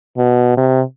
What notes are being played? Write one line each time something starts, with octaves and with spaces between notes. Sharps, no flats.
B2
C3